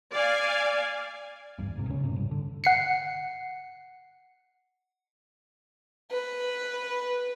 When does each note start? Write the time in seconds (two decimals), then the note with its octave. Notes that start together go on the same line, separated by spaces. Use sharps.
0.13 D5 F5 G#5
1.58 G#1 E2 G2
1.76 E1 G#2 C3
1.87 D#2 C#3 C4 C#4
2.04 A1 F#2 A2 C3
2.16 G#1 G2
2.31 D3
2.64 F#5 C7 C#7
6.11 B4